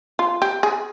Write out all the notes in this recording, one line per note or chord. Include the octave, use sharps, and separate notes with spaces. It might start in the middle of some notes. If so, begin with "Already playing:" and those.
F4
G4
G#4